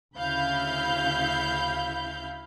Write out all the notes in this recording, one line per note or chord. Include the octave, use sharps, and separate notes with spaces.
D2 C#3 E4 F5 B5 G6